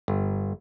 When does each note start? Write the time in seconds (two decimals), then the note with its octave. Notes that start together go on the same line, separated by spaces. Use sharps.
0.08 G1